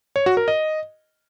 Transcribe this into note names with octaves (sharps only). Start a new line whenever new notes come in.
C#5
F#4
A#4
D#5